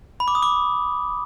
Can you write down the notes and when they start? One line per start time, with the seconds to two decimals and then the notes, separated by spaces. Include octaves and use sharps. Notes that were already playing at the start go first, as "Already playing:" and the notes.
0.20 B5
0.28 D6
0.35 D#6
0.43 D6